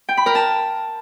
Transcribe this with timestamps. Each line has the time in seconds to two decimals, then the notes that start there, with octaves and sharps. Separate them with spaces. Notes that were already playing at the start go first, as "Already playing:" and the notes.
0.09 G5
0.17 B5
0.26 A#4
0.35 A5